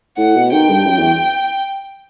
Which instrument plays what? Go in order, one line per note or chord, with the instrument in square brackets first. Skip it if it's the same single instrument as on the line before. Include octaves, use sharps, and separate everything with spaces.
[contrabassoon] A2 [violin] F#5
[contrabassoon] B2
[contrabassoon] D#3 [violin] G5
[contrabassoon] G2
F#2
E2